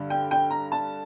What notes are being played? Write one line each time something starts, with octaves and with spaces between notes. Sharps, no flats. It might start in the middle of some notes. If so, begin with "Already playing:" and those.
Already playing: G2 D3
G5
G5
A#5
A5